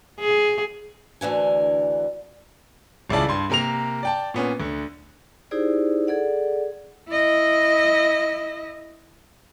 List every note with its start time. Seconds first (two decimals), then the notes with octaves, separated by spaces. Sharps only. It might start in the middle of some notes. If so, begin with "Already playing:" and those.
0.20 G#4
1.21 D2 D3 E3 G#5
3.10 D#1 C#2 C#3 E4 D5 A5
3.29 G2 C6
3.50 C3 A#3 A#4 A#5 F7
4.03 D5 G5 A5
4.34 A#2 B3 C#4
4.60 D2 D3
5.51 D#4 E4 G4 G#4 C5 D5
6.07 G#4 A4 D5 F#5
7.09 E4 D#5